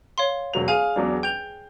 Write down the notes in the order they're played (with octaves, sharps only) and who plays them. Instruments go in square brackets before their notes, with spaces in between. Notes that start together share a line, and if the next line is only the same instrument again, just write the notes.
[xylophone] C#5 F5 C6
[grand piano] E1 F#3 F7
[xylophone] G#4 G#5 [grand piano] F5
[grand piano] E2 F#3 D4
[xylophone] G5 F7 [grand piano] G6